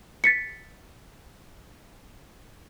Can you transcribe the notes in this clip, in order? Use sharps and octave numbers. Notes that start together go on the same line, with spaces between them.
A6 B6 C#7